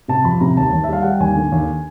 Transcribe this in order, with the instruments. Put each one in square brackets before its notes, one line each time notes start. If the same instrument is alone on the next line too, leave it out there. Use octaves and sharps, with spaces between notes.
[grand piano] C3 A5
F2 B5
C3 A#5
D#2 A5
D#2
E5
G3 F5
G3 F#5
G5
D#2 G#5
D3
D#2